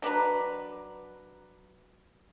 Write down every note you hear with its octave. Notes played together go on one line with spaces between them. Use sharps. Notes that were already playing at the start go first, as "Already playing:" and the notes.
F#3 D4 B4 A#5